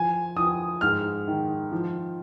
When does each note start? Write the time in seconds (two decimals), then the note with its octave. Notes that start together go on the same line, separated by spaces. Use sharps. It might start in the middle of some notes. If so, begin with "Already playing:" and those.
Already playing: F3 G#5
0.36 F3 D#6
0.81 G#2 F6
1.27 D#3
1.72 F3